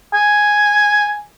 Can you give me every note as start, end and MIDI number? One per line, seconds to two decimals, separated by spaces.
0.14 1.17 80